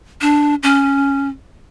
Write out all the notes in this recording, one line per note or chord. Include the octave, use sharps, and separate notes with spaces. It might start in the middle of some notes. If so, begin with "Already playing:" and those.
D4
C#4